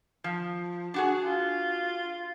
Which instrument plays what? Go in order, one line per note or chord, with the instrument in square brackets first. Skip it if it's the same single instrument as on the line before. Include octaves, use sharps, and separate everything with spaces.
[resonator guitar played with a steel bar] F3
D4 F#4 G#4
[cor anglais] F4